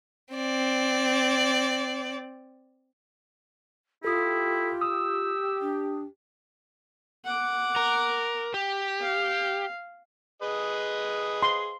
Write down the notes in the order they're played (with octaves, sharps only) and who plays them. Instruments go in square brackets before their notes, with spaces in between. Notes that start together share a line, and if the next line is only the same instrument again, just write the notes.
[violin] C4 D5
[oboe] E4 [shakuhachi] F4 [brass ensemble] G4 [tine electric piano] A4 D#6
[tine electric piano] D#6 [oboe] E6
[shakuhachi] D4
[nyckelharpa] F#5 D6
[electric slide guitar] A#4
G4
[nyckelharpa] F5
[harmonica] G#4 B4 D#5
[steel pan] C6